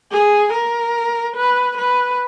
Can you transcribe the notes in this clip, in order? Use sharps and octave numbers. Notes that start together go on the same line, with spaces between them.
G#4
A#4
B4
B4